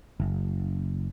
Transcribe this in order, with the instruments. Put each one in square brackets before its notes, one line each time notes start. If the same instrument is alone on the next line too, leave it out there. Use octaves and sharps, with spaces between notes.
[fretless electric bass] F#1